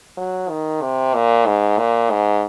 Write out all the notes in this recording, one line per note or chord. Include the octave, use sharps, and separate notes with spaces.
F#3
D#3
C3
A#2
G#2
A#2
G#2